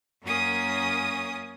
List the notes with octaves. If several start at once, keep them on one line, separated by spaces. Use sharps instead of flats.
F#2 A#3 C#4 A#4 G#5 D#6